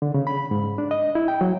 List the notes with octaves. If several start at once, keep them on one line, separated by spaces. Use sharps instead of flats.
D3
C#3
B5
G#2
D4
D#5
E4
G5
F#3